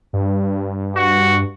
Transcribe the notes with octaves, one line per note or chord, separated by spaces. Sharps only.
G2
F#4